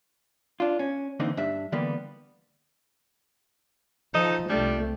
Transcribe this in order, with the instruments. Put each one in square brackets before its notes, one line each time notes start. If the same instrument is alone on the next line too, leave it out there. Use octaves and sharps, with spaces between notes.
[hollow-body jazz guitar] D4 F4
C#4
D3 E3 A#3 C4 D#4
G2 D4 E5
D3 E3 G3 A#3 B3
[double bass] F3 [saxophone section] D#4 A4 D#5
[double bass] C2 A3 [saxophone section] F3 G3 D4